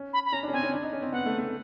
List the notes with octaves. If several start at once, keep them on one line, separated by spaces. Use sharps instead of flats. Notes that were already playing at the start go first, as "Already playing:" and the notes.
Already playing: C#4
B5
B5
C#4 A#5
D4
C#4
C4 G#5
C#4
D4
D#4
C#4
C4
B3 F#5
A3
A3